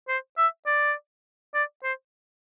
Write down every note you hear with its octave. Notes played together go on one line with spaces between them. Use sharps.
C5
E5
D5
D5
C5